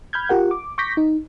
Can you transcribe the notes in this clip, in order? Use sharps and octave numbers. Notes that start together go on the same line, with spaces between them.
B5 F6 G6 G#6
F4 G4 A#4 F#5
D6
C#6 D6 G6 A#6 B6
D#4